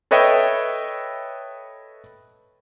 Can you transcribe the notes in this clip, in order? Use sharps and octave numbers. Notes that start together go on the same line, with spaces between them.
A4 B4 C#5 D#5 E5 G5